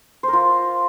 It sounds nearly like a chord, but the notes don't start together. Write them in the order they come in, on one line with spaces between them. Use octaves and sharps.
C5 A#4 F4